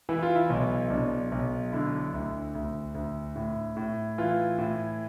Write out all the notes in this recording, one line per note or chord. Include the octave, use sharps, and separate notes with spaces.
E3 E4
F4
E4
B1
B1 D4
B1
D3 E4
D2
D2
D2
A2
A2
E3 F4
A2